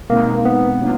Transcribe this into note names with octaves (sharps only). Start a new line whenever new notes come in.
B2 G#3 A#3 C4 D#4
B3
F#3 A#3 D4 F4